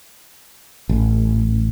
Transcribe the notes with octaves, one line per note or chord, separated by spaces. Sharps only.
A1